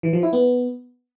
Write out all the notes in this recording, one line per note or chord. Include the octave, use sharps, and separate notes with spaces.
E3
F3
E4
B3